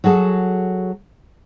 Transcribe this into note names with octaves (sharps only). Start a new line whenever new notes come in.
F#3 F#4 G#4 A4